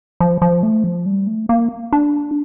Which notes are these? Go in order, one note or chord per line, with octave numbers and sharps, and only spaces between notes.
F3
F3
A3
F3
G3
A3
A#3
D4